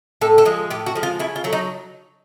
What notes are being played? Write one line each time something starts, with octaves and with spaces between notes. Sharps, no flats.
A2 A4
A4
F3 G#3
A2 G4
F#4
F3 G#3
F4
C#3 E4
F4
F#3 A3
D#4